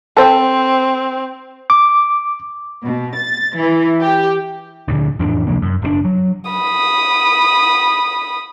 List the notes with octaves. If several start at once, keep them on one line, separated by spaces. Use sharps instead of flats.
C4 A4 C5 G5
D6
B2
A6
E3
G4
D2 A#2 D3
F2 A2 E3 D4
C3 F3 A#3 D4
F#2
F#1 B2 D4
F#3
B5 D#6